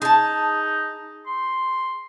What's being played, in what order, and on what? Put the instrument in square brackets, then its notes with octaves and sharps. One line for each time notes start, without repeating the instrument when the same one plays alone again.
[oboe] D#4 [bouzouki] G#4 A5
[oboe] C6